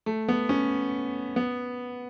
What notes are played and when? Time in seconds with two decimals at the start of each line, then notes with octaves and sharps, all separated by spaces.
0.06 A3
0.28 B3
0.49 C#4
1.36 B3